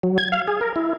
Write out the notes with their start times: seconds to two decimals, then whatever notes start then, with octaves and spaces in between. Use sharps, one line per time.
0.03 F#3
0.18 G#6
0.32 F5
0.48 G#4
0.61 A#4
0.76 E4